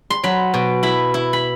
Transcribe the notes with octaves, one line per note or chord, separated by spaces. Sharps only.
C6
F#3 B5
B2
E4 B5
E4
B5